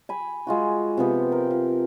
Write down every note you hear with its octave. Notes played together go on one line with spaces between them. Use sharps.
G#5 B5
G#3 F4 F#4
C3 F3 B3 G4
A#4 G5
F3